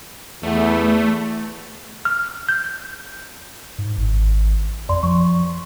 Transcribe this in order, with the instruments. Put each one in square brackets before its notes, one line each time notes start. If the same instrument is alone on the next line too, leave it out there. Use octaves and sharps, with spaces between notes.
[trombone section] E2 [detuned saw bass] A3
[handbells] F6
G6
[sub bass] G#2
G#1
[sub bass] F2 [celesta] D5 C6
[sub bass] F3 [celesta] C#6